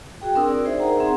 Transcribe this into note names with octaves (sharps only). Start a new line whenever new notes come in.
F#4 G#4 G5
C4 D4 A#4 D#6 E6
D5
D#4 G#4 C5 E5
D#4 G#4 A#4 F#5 A#5
C4 G#4 F#5 A#5